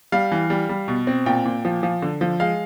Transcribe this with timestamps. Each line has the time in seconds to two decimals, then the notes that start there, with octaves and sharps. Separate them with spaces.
0.12 G3 F5
0.32 E3
0.50 G3
0.69 G3
0.88 B2
1.07 C4
1.26 A#2 G5
1.45 A#2
1.65 F3
1.83 F3
2.02 D3
2.21 F3
2.40 G#3 F5